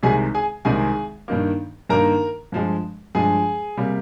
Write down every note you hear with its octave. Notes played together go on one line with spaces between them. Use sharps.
C2 C3 D#3 G#3 G#4 G#5
G#4 G#5
C2 C3 D#3 G#3 G#4 G#5
G2 D#3 A#3
G2 D#3 A#3 A#4 A#5
G2 F3 G#3
G2 F3 G#3 G#4 G#5
C3 G3 A#3